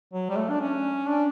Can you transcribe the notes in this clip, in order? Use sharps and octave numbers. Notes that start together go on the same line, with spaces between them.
F#3
G3
A3
D4
C#4
D4